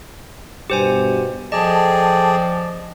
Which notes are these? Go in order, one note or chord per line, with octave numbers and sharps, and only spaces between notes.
G2 B2 G4 C5 G#5
F3 G#4 A4 D5 D#5 G5 A5